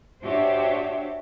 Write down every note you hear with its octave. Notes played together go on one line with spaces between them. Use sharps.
D4 F#4 G4 C5 C#5 E5